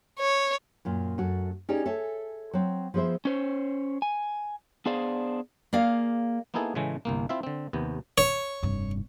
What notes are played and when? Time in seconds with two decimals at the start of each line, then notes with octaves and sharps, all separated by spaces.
0.20 C#5
0.85 F#2 A#2 F4
1.18 F#2 A3 F#4
1.69 C#4 D#4 G4 G#4 D5
1.86 A4 C#5 E5 G#5
2.53 F#3 C4
2.94 F3 B3 G#4 C5 E5
3.25 C#4 C5 C#5
4.02 G#5
4.86 B3 D4 G#4 C5 D5 F5
5.73 A#3 G#4 D5 F5
6.54 A#3 B3 D#4 E4 G#4 A4
6.75 A2 C#3 E3 G#3 A3
7.05 G1 C2 A#3
7.29 C4 E4 F4 E5 F5
7.43 D3 C4
7.73 D#2 C3 B3
8.18 C#5
8.63 F1 G2